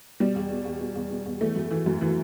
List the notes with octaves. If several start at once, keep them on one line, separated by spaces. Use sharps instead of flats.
B2 G3
E2
B2
E2
B2
E2
B2
E2
E3 A3
F#2
E3
F#2
E3